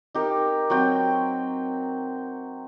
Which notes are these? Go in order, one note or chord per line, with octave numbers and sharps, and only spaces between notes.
D#4 G4 A#4
F#3 C4 G5